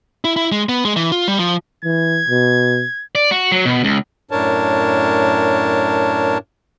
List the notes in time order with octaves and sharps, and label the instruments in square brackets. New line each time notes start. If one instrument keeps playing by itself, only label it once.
[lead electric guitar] E4
E4
G#3
B3
G#3
E3
F4
G3
F3
[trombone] E3 [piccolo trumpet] G#6
[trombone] B2
[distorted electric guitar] D5
F#4
F#3
B2
C#2
[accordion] F#2 A2 D4 A#4 C#5 A5